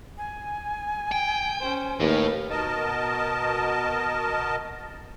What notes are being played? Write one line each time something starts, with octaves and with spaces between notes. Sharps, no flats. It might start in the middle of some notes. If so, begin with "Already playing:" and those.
G#5
G5
C#4 C5
D#2 A2 B4 F5
B2 A#4 D#5 A5